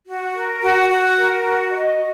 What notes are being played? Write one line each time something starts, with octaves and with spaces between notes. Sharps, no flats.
F#4
A#4
F#4
F#4
A#4
F#4
D#5
F#4